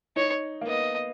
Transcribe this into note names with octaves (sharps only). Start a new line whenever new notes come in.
D#4 C#5
A#3
B3 D#5